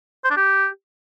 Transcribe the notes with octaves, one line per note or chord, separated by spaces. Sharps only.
C5
D4
G4